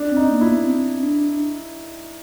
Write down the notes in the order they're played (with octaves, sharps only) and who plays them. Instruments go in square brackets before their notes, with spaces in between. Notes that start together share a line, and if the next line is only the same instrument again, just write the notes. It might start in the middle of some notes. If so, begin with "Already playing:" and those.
Already playing: [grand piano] D4
[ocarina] C4
[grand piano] D#4
[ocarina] A#3
[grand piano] E4
[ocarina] B3
C4
D4